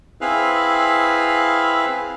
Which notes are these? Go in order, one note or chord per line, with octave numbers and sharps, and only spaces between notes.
C4 E4 G#4 B4 F5